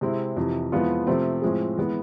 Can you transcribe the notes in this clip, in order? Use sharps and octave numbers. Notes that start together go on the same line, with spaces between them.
C3 G#3 C4 E4
F2 C3 E3
F2 E3 G#3 B3 F4
C3 F3 A3 C4
A2 F3 G#3 C4 G#4
E3 G#3 B3